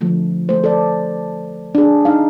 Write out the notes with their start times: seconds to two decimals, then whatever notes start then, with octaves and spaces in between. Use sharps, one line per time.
0.01 D3 F3 A3
0.49 A3 C5
0.64 A4 D5
1.75 D4 G#4
2.05 D#4 F5